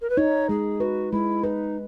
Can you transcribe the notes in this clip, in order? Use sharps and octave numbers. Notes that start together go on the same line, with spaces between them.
A#4
B4
D#4 C#5
G#3 G#4
F#4 B4
G#3 E4
D#4 B4